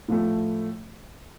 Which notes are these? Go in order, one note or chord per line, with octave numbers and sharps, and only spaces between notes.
A2 F3 A3